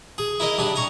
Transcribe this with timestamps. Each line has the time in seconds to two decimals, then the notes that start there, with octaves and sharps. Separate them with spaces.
0.18 G#4
0.40 E4 A#4 D#5
0.58 G3 D4 D#6
0.76 G#5 A#5 C#6